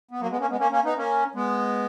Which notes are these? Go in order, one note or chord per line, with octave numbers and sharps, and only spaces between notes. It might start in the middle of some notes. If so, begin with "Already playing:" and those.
B3
F#3 A#3
G#3 B3
A#3 C#4
G#3 B3
A#3 C#4
A#3 C#4
B3 D#4
A#3 C#4
G#3 B3